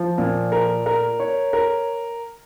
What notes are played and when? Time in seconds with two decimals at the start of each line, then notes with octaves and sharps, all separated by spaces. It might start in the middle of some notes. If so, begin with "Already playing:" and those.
Already playing: F3
0.18 A#2
0.52 A#4
0.86 A#4
1.20 C#5
1.53 A#4